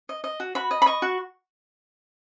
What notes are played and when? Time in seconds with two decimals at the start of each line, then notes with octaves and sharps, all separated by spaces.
0.09 D#5
0.24 D#5
0.40 F#4
0.55 F#4 B5
0.71 D#5
0.82 B5
0.86 D#5 C#6
1.02 F#4